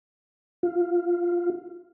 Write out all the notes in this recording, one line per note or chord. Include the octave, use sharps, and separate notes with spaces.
F4